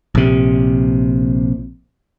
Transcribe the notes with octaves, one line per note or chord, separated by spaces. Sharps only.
A#1 C3